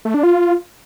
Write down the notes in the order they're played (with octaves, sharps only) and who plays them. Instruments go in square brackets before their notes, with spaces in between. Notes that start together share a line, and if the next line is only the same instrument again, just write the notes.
[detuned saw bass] A3
D4
F4